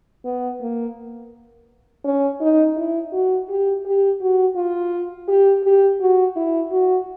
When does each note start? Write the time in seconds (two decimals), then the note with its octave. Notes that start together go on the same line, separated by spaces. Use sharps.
0.25 B3
0.61 A#3
2.04 C#4
2.40 D#4
2.76 E4
3.12 F#4
3.49 G4
3.85 G4
4.20 F#4
4.56 F4
5.28 G4
5.64 G4
6.00 F#4
6.36 E4
6.71 F#4